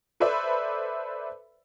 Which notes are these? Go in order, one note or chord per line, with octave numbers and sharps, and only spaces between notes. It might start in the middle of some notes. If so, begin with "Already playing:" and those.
A4 B4 C5 D5 E5 B5